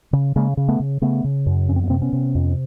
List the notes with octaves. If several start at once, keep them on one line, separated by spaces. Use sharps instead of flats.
C#3
C#3 G#3 A#3
C#3
A3 B3
C#3
C#3 A3 B3
C#3
F#2
F2 C#4
C4
B3
C3 A#3 C4
B3 C#4
C3
F2